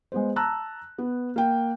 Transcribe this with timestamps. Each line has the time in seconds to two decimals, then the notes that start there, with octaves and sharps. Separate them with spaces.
0.12 G#3 B3 C5
0.36 A5 A#5 E6 F#6
0.98 B3
1.36 A#3 G5